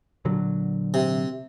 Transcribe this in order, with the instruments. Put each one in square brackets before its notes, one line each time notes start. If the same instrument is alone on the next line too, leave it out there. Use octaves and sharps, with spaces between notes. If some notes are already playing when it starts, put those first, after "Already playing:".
[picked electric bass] A#2 D3 F#3
[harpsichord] C3